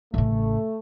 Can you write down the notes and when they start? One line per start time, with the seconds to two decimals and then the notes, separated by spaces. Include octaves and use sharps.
0.14 A1 C#3 A3